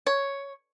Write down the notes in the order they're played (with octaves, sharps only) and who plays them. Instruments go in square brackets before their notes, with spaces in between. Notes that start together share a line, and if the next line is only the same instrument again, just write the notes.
[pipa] C#5